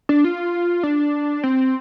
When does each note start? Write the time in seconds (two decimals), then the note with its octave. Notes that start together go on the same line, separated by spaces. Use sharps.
0.09 D4
0.24 F4
0.83 D4
1.44 C4